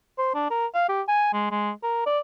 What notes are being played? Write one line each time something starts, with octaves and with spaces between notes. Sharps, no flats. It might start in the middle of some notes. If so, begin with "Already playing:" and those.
C5
D4
A#4
F5
G4
G#5
G#3
G#3
A#4
D5